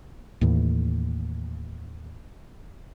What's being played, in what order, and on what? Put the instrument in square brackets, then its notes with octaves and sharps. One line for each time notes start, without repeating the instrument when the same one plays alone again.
[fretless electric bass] D#2 A2 E3